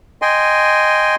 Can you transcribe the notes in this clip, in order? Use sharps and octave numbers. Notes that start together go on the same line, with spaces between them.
D#5 G5 G#5 C6